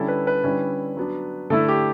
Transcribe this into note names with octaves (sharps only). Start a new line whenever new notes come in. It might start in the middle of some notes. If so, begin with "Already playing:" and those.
Already playing: D3 G3 C#4 E4 A4
B4
B4
D3 G3 C#4 E4
F#3 B3 D4
D3 A3 E4 A4
G4